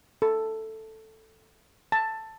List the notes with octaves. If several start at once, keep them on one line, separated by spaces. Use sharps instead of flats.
A4
A5